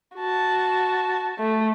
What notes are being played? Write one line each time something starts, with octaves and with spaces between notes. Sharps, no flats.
F#4 A5
A3